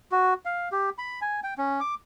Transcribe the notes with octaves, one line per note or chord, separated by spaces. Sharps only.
F#4
F5
G4
B5
G#5
G5
C#4
D6